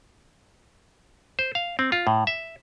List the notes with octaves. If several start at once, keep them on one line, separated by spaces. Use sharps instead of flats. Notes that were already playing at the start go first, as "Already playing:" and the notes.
C5
F5
C4
F4
A2
E5